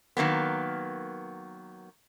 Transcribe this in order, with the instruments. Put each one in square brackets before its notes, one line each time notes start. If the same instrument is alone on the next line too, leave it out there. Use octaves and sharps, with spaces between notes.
[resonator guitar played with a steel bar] D#3 F#3 A#3 B3